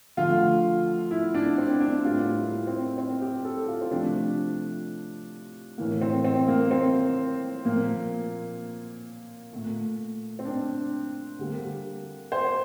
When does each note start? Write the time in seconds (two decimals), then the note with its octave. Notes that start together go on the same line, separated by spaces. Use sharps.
0.17 D3 F3 A3 F4
1.11 E4
1.34 D4
1.58 C4
1.80 D4
2.04 A2 G3 A#3 F4
2.35 E4
2.67 C4
2.98 C4
3.22 G4
3.44 A4
3.68 F4
3.81 C4
3.91 C3 F3 A3 D4
5.78 A2 E3 A#3
6.01 C4
6.24 C4
6.48 A#3
6.71 C4
7.65 A#2 F3 A#3
9.53 A#2 A3
10.39 C4
10.45 D4
11.39 D3 G3 A#3
12.32 C5